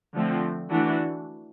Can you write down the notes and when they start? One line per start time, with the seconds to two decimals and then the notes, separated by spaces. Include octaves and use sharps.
0.15 D3 F3 A3 C4
0.71 E3 A3 D4 F#4